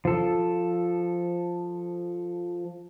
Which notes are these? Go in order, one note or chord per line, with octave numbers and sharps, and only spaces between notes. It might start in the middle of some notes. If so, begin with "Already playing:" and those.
F3 A4